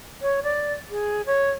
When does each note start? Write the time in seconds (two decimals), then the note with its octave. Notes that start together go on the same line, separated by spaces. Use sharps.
0.22 C#5
0.43 D5
0.90 G#4
1.26 C#5